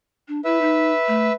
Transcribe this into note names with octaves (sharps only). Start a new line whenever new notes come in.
D4
E4 B4 E5
D#4
A3